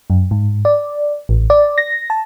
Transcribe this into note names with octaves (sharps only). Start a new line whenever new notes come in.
F#2
G#2
D5
A1
D5
A#6
A5